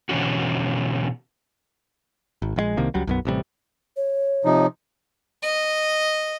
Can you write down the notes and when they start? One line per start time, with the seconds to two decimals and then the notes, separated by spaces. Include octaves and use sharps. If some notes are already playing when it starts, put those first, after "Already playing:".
0.09 B2 D3 E3 C#4 F#4
2.42 G#1
2.56 A#1 D3 G#3
2.77 C2 C3 D#3 A#3
2.94 C#2 F#3 G3
3.07 B1 F#2 B3
3.25 A1 C3 E3 G3
3.96 C#5
4.45 C3 F3 D#4
5.43 D#5